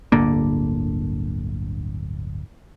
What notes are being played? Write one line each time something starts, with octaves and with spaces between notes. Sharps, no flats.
D1 G1 D3 A#3